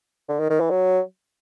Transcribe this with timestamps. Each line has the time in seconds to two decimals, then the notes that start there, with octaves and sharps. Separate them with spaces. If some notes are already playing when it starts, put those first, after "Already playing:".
0.29 D3
0.40 D#3
0.50 D#3
0.60 E3
0.71 F#3